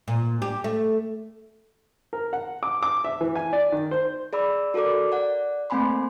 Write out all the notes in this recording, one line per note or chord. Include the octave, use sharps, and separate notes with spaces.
A#2
G4
A3
A#4
F#5
D6
D6
E5
E3
G#5
D5
D#3
C5
G#4 D5 B5 E6
F#4 A4 A#4 D5 D6
D5 F#5
A3 A#3 C4 G#5 B5 C6